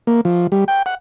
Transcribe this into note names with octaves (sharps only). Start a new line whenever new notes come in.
A#3
F3
G3
G5
F#5